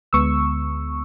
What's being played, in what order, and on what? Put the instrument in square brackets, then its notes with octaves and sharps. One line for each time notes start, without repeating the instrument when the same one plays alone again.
[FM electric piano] D2 D3 G#3 B3 C#6 E6